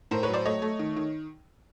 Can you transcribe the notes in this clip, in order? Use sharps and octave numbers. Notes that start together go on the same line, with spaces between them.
A2 A#4 C5
B4 C#5
F#3
C5 D5
A3 C#5 D#5
A3
D#3
D#3